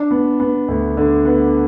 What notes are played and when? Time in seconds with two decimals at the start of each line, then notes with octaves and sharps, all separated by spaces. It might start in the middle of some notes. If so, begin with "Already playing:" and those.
Already playing: D4
0.11 B3
0.40 B3
0.68 D2
0.97 D3
1.25 B3